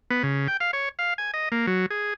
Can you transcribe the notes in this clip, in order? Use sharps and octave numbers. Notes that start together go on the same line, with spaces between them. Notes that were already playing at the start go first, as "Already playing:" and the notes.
B3
C#3
G5
F5
C#5
F5
G#5
D#5
A#3
F#3
G#4